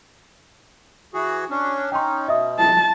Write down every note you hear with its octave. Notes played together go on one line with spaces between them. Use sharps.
E3 F#4 G#4
C#4 D4
C#4 D#4 G5 C6
B2 D#5 E5 D#6
A5